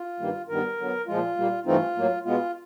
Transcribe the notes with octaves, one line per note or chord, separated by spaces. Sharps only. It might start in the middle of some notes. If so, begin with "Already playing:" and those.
Already playing: F4
G2 D#3 G3 A#3
G2 D#3 G3 B3 A#4
D3 F#3 B3
A#2 F3 G#3 F4
A#2 G3 A#3
G2 E3 A3 C4 D#4 F4
A2 F#3 A#3
B2 G#3 B3 F4